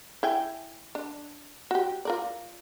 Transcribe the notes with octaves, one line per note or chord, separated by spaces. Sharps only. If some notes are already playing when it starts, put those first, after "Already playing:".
E4 G5 G#5
D4
F#4 G4
F4 A#4 D5